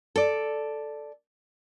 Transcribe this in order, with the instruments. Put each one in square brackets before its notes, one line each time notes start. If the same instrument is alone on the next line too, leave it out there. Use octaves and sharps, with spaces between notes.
[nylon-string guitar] A4 D5